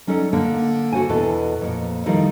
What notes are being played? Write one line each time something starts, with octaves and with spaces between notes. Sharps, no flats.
F#3 C#4 D#4 A4 D5
D3 A#3
F#4 A4 C5 G#5
E2 B2 E4 A4 B4
F2 A#2
D#3 F3 G3 D#4 E4 A4